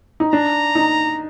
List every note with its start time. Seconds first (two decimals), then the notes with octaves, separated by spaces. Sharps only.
0.20 D#4
0.32 D4 A#5
0.75 D#4